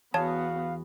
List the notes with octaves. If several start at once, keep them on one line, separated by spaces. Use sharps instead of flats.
E2 B3 F#4 C#5 F5 A5